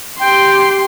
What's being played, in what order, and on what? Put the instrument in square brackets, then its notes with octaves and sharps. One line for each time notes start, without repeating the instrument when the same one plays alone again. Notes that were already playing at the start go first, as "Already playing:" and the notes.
[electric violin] G4 C6 [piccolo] G5